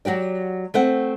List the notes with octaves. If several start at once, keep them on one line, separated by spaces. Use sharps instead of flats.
F#3 F#4 G4 D5
A3 C4 F#5